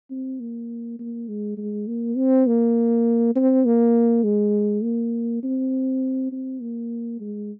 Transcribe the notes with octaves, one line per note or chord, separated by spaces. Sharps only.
C4
A#3
A#3
G#3
G#3
A#3
C4
A#3
C4
A#3
G#3
A#3
C4
C4
A#3
G#3